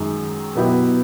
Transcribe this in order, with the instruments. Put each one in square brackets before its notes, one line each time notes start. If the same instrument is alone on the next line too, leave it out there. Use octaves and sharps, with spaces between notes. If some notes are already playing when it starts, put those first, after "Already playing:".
Already playing: [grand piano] F#2 D#3 G#3
B2 F#3 B3 E4 G4